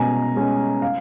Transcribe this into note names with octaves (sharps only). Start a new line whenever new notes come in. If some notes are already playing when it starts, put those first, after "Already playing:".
Already playing: B2 G#3 C#4 G#5 A#5
G#3 C#4
F5